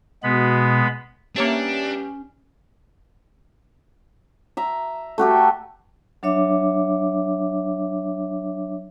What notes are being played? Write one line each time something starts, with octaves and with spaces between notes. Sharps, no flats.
B2 G#3 B3 B5
G3 A#3 B3 C#4 D4 G4 C#5 E5
E5 A#5
A3 F#4 G4 A4
F#3 D4 C#5 E5 D6